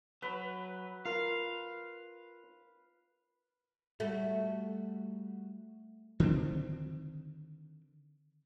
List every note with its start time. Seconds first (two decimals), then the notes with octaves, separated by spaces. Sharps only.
0.22 F#3 B4
1.05 F4 A#4 F5
4.00 G3 A3 F#4
6.20 D3 D#3 G#3 C4